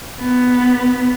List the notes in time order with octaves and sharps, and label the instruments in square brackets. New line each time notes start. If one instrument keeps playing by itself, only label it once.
[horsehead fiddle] B3